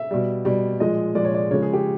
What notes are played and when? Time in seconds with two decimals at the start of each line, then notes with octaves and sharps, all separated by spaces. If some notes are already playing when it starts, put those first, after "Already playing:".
Already playing: E5
0.11 B2 G3
0.45 B2 G3
0.80 A#2 F3 G#3 D#5
1.15 A#2 F3 G#3 D5
1.25 C#5
1.34 D5
1.51 C#3 F3 G#3 C#5
1.62 G#4
1.73 G4